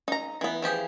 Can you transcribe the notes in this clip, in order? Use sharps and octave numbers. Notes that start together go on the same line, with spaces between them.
D#4 A#5
E3 B3
E3 F3 G4 G#4